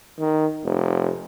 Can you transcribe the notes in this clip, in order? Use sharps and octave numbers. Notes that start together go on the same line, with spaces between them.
D#3
F1